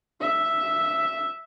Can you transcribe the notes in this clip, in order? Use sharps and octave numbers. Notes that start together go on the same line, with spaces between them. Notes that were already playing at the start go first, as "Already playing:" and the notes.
E5